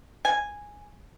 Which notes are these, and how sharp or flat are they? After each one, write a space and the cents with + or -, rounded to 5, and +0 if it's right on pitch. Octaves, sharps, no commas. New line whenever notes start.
G#5 -5